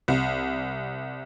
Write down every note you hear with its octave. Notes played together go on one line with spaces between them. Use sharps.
C2